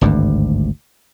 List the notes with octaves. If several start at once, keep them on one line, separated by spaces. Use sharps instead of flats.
G#1 D2 G2